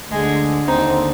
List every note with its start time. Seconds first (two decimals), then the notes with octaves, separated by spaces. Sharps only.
0.10 D2 D3 G#3
0.67 D#2 D3 C4 D#4